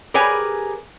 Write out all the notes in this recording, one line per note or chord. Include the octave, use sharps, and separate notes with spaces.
G4 G#4 A#4 B4 C#5 G#5